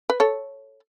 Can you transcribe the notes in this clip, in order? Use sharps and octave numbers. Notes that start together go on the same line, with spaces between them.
B4
A4 C#5